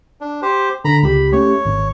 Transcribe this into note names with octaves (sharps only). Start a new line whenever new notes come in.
D4
G4 C5
D3 A#5 B5
C#2 G4 B5
A3 C#4 G4 C#5
G#1